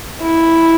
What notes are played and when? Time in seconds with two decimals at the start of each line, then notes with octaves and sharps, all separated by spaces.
0.22 E4